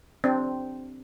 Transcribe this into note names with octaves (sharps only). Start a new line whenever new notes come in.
C4 D4